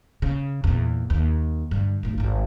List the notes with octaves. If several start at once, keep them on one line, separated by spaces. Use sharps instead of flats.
C#3
E2 A#2
D#2
G2 D3
G1 A2
G#1 E4